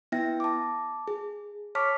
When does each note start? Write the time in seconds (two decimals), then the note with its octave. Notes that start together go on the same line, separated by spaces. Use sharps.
0.12 B3 E4 E5 G5 A#6
0.40 A5 D6
1.08 G#4
1.75 C#5 A5 C#6 D6 F6 B6